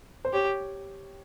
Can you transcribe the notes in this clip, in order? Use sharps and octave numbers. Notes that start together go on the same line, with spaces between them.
C5
G4 C#5